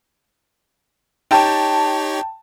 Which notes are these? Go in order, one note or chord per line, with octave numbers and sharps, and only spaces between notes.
D#4 G4 C#5 G5 A5